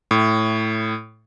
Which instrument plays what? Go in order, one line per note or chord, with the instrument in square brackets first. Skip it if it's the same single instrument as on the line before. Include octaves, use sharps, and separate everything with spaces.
[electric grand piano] A2